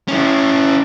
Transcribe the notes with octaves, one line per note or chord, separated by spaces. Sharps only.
C#4 E4